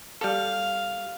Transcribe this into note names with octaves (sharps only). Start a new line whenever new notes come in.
G3 A4 F5